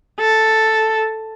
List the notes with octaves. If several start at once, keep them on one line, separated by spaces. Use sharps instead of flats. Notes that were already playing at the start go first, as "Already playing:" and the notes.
A4